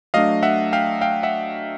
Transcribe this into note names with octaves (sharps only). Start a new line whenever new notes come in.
F#3 A3 D4 D#5 F5
E5 F#5
F5 G5
F5 G5
E5 F#5